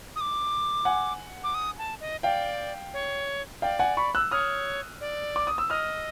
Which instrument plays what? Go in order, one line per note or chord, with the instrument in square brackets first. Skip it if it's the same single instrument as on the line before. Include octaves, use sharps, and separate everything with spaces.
[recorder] D#6
D6
[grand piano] F#5 G#5
[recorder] D6
D#6
A5
D#5
[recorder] D5 [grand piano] F5 G5
[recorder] C#5
[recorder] D5 [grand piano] F5 G5
[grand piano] F#5 G#5
B5 C#6
E6 F#6
[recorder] C#5 [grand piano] D#6 F6
[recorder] D5
[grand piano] D6
D#6
E6
[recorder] D#5 [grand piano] D#6 F6